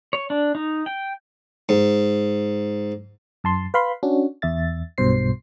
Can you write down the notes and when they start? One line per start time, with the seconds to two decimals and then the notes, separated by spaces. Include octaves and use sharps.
0.13 C#5
0.30 D4
0.55 D#4
0.86 G5
1.69 G#2
3.44 F#2 A5 C6
3.74 B4 F5 B5 C6
4.03 C#4 D4 F#4
4.42 E2 E5 A6
4.98 B1 G2 B2 C5 C7